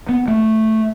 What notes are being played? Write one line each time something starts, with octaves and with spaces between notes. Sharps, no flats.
B3
A3